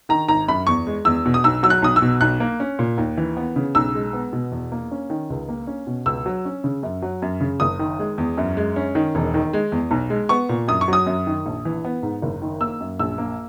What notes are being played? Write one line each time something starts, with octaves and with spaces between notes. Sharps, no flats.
D#3 A#5
G#1 A#5
F#2 B5
E2 C#6
G#3
E2 E6
B2
D#6
B1 E6
F#3 E6
F#6
B1 D#6
E6
B2
B1 F#6
A#3
C#4
A#2
D#2
E3
B3
C#3
B1 E6
G#3
B3
B2
E2
A#3
C#4
D#3
C#2
A#3
C#4
B2
C#2 E6
F#3
C#4
C#3
F#2
F#3
F#2
C#3
F#1 D#6
D#3
G#3
E2
F#2
G#3
C#4
D#3
E1
D#3
G#3
E2
B1
G#3
B3 C#6
A#2
F#2 D#6
C#6
F#3 D#6
F#2
D#3
A#1
E3
B3
G#2
F#1
D#3
A#3 E6
F#2
A#1 E6
A#3